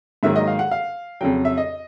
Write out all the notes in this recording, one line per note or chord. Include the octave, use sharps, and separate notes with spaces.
G#2 D#3 F#3 A#3 E5
D#5
F5
F#5
F5
F2 C#3 F#3 G5
E5
D#5